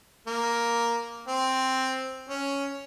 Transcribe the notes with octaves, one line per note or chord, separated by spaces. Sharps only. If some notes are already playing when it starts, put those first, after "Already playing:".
A#3
C4
C#4